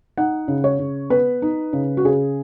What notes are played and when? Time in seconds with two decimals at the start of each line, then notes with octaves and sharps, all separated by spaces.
0.18 D#4 F#5
0.48 C#3
0.64 C#5
0.79 C#3
1.10 B3 B4
1.42 D#4
1.73 C#3
1.97 F#4
2.05 C#3 G#4